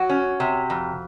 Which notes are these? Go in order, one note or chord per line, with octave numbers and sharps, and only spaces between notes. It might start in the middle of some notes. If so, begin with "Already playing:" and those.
Already playing: F#3 F#4
C#4
C3
F2